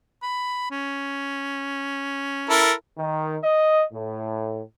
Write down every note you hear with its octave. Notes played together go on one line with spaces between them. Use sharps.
B5
C#4
E4 A4 A#4
D#3
D#5
A2